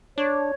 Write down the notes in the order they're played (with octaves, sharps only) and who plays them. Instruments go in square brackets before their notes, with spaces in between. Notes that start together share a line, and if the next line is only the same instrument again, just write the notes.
[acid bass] D4 [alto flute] C#5